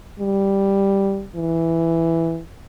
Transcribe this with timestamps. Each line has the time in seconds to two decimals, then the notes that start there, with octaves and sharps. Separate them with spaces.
0.19 G3
1.36 E3